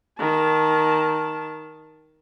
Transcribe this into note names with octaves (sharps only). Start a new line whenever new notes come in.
D#3 A5